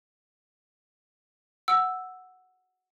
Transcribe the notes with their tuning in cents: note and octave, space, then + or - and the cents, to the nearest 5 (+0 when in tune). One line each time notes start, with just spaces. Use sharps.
F#5 +0 E6 +0